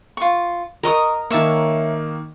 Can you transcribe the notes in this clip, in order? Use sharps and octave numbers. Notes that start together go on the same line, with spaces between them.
F4 C#6
A#4 D#5 A#5 C#6 D#6
D#3 A#3 C#5 E5 A5